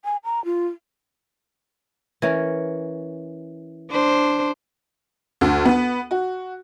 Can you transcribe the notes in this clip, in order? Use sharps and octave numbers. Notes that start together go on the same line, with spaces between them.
G#5
A#5
F4
E3 C#4 A#4
D4 C5
D2
B3
F#4